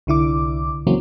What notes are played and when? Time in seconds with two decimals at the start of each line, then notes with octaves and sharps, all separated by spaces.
0.07 C2 D3 E4 D6
0.87 C#3 E3 F#3 A#3 C4 C#4